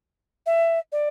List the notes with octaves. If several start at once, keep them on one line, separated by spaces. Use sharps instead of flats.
E5
D5